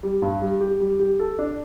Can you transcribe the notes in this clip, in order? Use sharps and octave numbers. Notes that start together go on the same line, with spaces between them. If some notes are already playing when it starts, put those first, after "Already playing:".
G3
G2
G3
G4
G3
G4
A4
D4